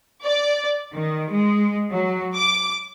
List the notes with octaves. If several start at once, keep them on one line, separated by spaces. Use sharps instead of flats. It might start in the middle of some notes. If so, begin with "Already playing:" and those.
D5
D#3
G#3
F#3
D6